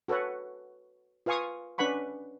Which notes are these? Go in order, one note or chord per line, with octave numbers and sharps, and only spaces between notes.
F#4 A4 B4 C#5 F#5
F4 B4 F5 G#5 C#6 D#6
C#4 D4 B4 F#5 B5 C#6